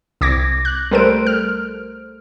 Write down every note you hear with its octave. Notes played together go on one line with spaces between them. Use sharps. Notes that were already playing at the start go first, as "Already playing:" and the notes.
C2 D6 G#6 A#6
F#6
G3 A3 A4 A#4 C5 D7
F6